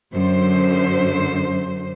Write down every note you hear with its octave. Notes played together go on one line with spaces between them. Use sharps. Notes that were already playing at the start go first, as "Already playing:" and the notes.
F#2 D3 C5